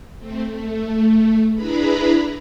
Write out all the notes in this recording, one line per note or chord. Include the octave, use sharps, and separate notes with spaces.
A3 C4
A3
D4 E4 G#4 B4 A#5 B5